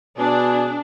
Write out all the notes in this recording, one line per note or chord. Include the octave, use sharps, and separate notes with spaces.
B2 D4 G#4